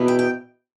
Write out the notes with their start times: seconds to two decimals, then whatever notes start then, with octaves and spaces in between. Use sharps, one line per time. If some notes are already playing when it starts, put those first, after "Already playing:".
Already playing: E2 B2 B3 E4
0.08 G5
0.19 G5